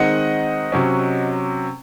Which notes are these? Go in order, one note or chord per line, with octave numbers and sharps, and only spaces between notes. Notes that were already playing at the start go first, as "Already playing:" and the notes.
Already playing: D#3 G#3 C4 D#4 D#5 F#5
C3 F#3 C#4